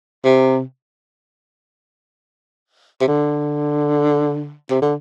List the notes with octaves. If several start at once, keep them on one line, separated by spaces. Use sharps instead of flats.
C3
C3
D3
C3
D3